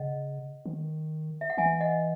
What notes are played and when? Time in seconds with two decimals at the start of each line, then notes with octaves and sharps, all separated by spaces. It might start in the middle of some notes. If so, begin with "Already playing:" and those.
Already playing: C#3 D#5 F#5
0.66 D#3
1.41 E5
1.50 F#5
1.57 E3 E5 G#5
1.81 D#5 F#5